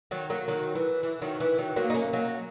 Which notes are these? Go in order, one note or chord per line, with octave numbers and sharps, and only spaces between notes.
D#3 F#3
F#3 A#3
D#3 F#3
E3
E3
D#3 F#3
E3
D#3 F#3
F#3 A#3
D#4
A#3 C#4
F#3 A#3